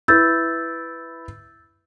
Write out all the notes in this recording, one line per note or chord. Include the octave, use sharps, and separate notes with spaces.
E4 B4 E6 G6 A6